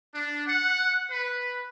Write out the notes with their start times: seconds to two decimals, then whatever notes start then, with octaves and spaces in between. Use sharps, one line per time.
0.14 D4
0.45 F#5
1.09 B4